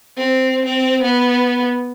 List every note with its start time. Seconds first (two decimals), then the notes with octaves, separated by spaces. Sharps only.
0.17 C4
0.65 C4
1.02 B3